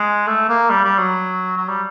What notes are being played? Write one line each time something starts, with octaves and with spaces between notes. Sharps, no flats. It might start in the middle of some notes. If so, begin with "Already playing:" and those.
Already playing: G#3
A3
A#3
G3
G3
F#3
F#3
G3